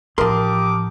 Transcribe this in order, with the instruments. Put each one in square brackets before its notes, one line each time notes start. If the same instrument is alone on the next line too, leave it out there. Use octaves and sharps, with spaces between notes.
[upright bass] A1 [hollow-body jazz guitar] F3 C6 [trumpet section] G4 D6 D#6 [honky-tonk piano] A#4